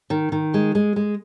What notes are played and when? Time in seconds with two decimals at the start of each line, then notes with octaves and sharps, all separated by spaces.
0.10 D#3
0.32 D#3
0.54 G#3
0.75 G#3
0.96 G#3